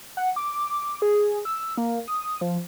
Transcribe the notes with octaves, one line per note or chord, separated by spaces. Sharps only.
F#5
D6
G#4
E6
A#3
D#6
F3